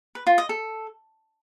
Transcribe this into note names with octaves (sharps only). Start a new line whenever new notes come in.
B4
F4
D#5
A4